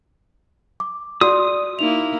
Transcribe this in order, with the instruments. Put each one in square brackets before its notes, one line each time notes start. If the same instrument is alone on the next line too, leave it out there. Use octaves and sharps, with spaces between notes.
[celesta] D6
[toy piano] F#4 [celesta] D5 [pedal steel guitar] D#6
[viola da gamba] A#3 E4 [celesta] D#4 F7